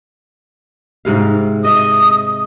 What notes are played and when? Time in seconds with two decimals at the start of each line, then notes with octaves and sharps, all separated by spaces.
1.05 G#2 C3 F5
1.65 D#5 E5 D#6